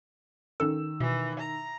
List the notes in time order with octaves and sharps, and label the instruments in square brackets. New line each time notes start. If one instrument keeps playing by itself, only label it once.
[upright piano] D#3 E6 [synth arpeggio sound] C#4 A4
[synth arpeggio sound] B2 [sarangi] E3
[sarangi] A#5